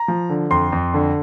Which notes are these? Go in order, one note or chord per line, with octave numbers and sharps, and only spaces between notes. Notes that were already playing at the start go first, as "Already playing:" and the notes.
Already playing: A#5
F3
D3
F2 C6
F2
D3